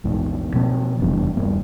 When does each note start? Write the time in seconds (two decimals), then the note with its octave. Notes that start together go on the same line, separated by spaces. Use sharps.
0.04 A#1 E2 G#2
0.54 B2 F3 A#3 C4
1.00 F1 E2 G2 C#3
1.37 D#1 G2 A#3